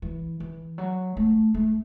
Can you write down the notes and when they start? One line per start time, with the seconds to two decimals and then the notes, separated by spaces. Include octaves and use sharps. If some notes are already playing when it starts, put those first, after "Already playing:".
0.02 E3
0.40 E3
0.78 F#3
1.17 A3
1.54 A3